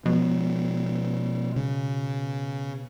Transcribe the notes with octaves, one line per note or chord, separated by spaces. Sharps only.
B2 F3 G#3
C#3